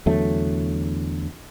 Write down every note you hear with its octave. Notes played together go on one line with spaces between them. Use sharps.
E2 D3 F#3 A3